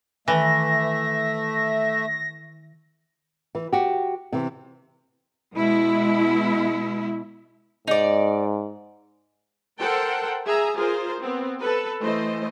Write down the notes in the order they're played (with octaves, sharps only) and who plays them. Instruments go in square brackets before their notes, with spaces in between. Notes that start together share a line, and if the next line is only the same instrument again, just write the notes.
[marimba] D#3 [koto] E3 [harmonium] A3 E5 [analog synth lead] A#6
[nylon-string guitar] E3
F#4 G4
C3 E3
[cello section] B2 G#3 E4
[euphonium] G#2 [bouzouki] D#4 D5
[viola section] A4 A#4 C5 F#5 G5 A5
G#4 E5 G#5 A#5
F4 G#4 A#4 C5
B3 C4
A4 B4
E3 A3 C5 D#5